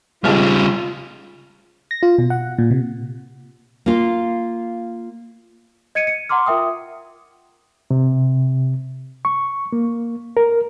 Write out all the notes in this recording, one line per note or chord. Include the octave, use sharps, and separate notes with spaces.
G#1 C#3 G3 F4 F6
A#6
F4
B2
F#5
A#2
C3
A#3 F4
D#5 G#6 C#7 D#7
C#7
F#5 A#5 C6 D6 F6
F4 A#4 E5 G5 D#6
C3
C#6
A#3
A#4